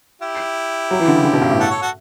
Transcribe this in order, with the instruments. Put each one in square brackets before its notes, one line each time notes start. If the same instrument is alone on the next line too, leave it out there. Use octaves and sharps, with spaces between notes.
[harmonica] E4 G4
[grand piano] F#3
E3
D3
C#3
D3
B2
G2
A2
[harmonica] F#4 A4
A4 C#5
F#4 A4